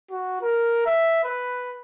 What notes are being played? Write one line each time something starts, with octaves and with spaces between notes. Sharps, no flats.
F#4
A#4
E5
B4